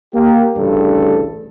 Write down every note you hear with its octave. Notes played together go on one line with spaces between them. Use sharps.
A#3 G4
A1 D2 G2 C#3 A4